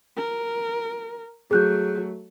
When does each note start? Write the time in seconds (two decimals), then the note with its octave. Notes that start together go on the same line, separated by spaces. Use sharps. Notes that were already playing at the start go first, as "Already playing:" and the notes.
0.17 A#4
1.51 F#3 A3 G#4 F#6 G6